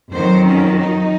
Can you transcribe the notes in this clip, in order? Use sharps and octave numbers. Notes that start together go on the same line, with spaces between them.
F2 D#3 F#3 C5
C#4
D#4